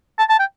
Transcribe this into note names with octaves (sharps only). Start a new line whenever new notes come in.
A5
A5
G5